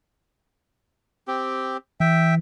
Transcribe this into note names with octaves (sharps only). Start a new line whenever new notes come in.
C4 G4
E3 E5 G5